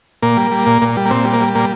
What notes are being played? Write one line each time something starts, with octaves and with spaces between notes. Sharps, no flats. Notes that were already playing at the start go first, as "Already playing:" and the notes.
A#2 A#3
G3
G3
A#2
A#2
G3
A#3
A#2 C4
G3
A#3
G3
A#2 A#3